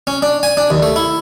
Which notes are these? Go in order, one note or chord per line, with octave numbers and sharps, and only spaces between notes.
C#4
D4
G#5
D4
D#2
A3
E4